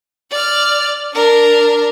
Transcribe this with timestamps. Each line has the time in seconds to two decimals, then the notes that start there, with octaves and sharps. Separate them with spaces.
0.31 D5 F6
1.13 D4 A#4